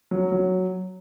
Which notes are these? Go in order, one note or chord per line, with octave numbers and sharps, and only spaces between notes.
F#3
F#3